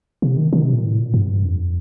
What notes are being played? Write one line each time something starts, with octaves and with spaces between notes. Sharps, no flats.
C3
D#3
D#3
C3
A#2
A2
A#2
G2
F2